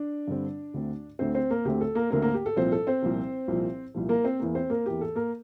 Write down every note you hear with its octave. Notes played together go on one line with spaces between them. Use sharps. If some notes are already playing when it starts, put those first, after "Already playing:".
Already playing: D4 D5
G2 D3 G3 C4
D2 D3 A3 C4
D2 D3 A3 C4 C5
C4 C5
A#3 A#4
D2 D3 A3 C4 G4
A4
A#3 A#4
D2 D3 A3 A#3 C4 A#4
A#3 A#4
G4
A4
C2 A#2 F3 C4 C5
A4
C4 C5
C2 A#2 F3
C2 A#2 F3
C2 A#2 F3
A#3 A#4
C4 C5
E2 E3 A#3
C4 C5
A#3 A#4
E2 E3 A#3 G4
A4
A#3 A#4